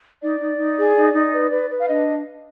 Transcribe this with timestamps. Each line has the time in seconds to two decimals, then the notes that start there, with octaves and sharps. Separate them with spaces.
0.21 D#4 D5
0.39 D#4
0.58 D#4
0.77 G#4
0.95 D#4
1.13 D#4
1.32 B4
1.51 B4
1.70 B4
1.78 F5
1.88 D4 D#5